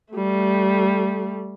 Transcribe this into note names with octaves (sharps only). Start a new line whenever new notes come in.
G3 A3